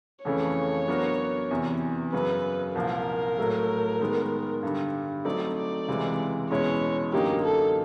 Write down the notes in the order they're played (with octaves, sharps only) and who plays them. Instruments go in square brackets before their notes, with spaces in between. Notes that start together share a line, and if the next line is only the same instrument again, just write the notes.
[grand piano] F2 C#3 E3 A3 C#4 [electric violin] C#5
[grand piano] F#3 B3 D4 F#4 A#4
E2 C3 E3
[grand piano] F#2 C#3 F#3 [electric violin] B4
[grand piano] C2 A#2 F3 [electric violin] A#4
[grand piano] A2 F#3 A3
D#3 G#3 B3
G2 D3 G3
[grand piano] F#3 A3 C4 D#4 [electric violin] D5
[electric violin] D5
[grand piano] C#2 C3 E3 G#3
[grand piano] E2 B2 G#3 C#4 E4 [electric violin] C#5
[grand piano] F#2 D3 F#3 A#3 D#4 [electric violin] G4
[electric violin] A4